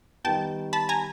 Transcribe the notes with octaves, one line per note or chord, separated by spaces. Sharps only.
D#3 G3 B3 G5 A5
A5 B5
G#5 A#5